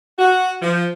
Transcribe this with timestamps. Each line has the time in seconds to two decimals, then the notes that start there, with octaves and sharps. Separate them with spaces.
0.19 F#4
0.62 F3